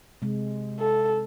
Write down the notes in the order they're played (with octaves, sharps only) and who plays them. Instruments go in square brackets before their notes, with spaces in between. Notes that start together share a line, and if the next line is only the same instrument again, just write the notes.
[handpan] C3 G#3
[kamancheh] A4